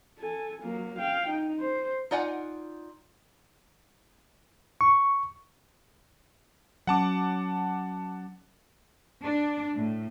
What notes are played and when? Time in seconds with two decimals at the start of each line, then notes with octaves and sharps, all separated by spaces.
0.19 A4 G#5
0.63 F#3 A#3
0.98 F5 G5
1.29 D#4
1.60 C5
2.11 D#4 F4 D5 F#5 G#5
4.81 C#6
6.87 F#3 C#4 F#5 A5 D6
9.23 D4
9.75 A2